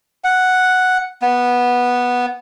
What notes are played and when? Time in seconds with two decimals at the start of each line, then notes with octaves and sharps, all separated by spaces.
0.24 F#5
1.22 B3